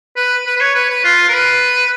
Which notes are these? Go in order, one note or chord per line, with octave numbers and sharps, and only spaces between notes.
B4
B4
B4
C#5
B4
B4
F4
A#4
B4